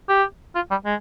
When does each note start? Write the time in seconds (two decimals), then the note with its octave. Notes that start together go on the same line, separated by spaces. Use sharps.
0.09 G4
0.55 F4
0.71 G3
0.85 G#3